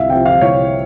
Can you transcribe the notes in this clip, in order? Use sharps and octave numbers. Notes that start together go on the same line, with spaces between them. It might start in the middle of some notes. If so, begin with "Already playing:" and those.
Already playing: C2 E5 F5
C3 F3 G5
F5
C2 C#5